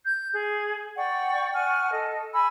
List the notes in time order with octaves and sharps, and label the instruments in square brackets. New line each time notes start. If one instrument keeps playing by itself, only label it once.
[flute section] G6
G#4
D5 F#5 G5 C#6
F#5 G#5 C#6 F6
A4 D#5
G#5 B5 E6